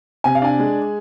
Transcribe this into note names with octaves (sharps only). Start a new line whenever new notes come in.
C3 G#5
F5
D4 G#5
G#3